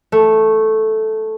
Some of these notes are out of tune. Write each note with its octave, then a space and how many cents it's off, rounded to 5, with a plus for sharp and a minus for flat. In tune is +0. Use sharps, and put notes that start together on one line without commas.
A3 -5